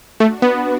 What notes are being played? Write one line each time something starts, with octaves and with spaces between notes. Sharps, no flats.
A3 D4 F#4
B3